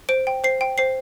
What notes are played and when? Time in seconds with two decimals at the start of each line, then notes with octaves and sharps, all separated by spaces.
0.09 C5 D7
0.27 G5
0.44 C5 C7
0.61 G5
0.78 C5 C7